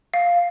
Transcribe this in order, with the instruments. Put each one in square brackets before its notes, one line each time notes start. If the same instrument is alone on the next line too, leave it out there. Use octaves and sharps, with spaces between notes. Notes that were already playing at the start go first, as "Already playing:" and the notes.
[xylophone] F5